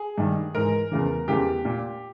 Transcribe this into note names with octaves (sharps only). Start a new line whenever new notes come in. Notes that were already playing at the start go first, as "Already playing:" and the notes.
Already playing: G#4
G2 D#3
G#2 E3 A#4
E2 C#3 E3
E2 C#3 E3 G4
A#2